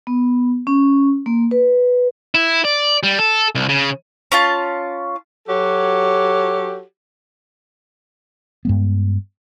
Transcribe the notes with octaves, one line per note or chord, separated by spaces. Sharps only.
B3
C#4
A#3
B4
E4
D5
G3
A4
C2
C#3
C#4 F4 A5
F#3 F#4 G4 A4 C#5
G2 G#3 B3